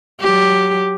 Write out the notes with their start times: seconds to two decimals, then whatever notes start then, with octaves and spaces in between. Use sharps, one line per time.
0.21 F#3 G4